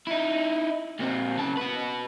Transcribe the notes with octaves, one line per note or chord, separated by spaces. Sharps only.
D#4 E4
A#2 C4
C#3 A5
F#4 B4